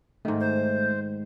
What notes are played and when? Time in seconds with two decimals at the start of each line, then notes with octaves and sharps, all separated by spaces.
0.25 G#2 D#3 A3
0.40 C5